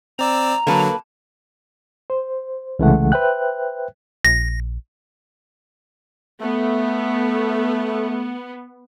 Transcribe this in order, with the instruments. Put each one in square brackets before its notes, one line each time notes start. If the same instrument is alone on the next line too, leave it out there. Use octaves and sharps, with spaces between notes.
[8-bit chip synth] C4 D5 E6 [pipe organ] A#5
[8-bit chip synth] D3 F#3 [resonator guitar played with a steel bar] A#3 A4 B4
[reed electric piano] C5
C2 C#3 E3 G#3 A3 F#5
B4 C5 E5 G5 F#6
[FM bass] A#1 [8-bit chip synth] A#6
[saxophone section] A3 [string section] B3